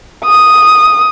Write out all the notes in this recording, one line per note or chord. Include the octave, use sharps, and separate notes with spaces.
D#6